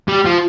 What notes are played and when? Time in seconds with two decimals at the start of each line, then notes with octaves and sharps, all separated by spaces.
0.08 G3
0.25 F3